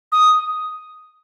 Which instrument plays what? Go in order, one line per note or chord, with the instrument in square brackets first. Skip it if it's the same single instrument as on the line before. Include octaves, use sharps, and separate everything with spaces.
[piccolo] D#6